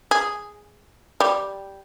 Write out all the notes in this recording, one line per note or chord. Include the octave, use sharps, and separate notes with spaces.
G#4
G3